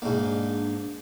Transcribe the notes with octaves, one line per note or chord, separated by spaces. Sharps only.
G#2 A#3 D4